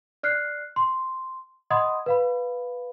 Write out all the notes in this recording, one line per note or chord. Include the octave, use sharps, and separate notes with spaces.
D5 F6 F#6 C7
C6
D#5 F#5 B5 C6 D#6 G#6
B4 F5 B5